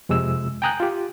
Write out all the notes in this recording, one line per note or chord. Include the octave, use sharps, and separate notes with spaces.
F2 C3 G#3 E6
G5 G#5 A#5 D#6 F#6 G6
F4 G4